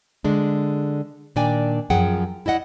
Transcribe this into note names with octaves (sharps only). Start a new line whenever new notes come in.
D3 G#3 D4
A#2 D#3 D4 D5 G5 G#5
F#2 F3 F#3 G#4 F#5 G5
E4 D5 D#5 F#5